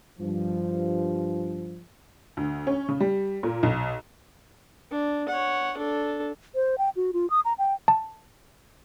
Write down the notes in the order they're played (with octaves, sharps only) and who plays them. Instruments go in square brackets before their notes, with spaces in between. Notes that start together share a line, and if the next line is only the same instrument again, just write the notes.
[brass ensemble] G2 F3
[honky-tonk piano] D2
C#4
C#3
G3
A#2
B1
[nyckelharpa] D4
C#5 F#5
D4 A4
[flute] C5
G5
F#4
F4
D#6
A#5
G5
[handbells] A5